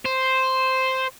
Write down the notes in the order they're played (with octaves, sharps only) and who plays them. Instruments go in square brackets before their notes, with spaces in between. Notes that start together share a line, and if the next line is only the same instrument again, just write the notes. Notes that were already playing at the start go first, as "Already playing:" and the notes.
[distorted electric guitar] C5